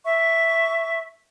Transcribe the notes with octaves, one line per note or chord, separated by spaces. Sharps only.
E5 C#6